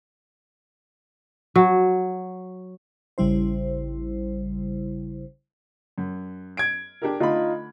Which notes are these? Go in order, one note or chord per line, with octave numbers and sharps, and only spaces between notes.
F#3
A1 C#3 G3 E4 C5
F#2
G#6 D7
D4 G4 A#4
D3 A3 D#4 F4 B5